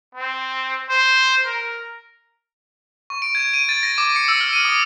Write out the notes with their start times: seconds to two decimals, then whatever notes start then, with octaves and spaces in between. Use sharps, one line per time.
0.15 C4
0.89 C5
1.46 A#4
3.10 C#6
3.22 D7
3.35 G#6
3.53 D#7
3.69 A6
3.83 A#6
3.98 D6
4.16 C#7
4.28 E6
4.41 F6
4.53 D#7
4.65 D#6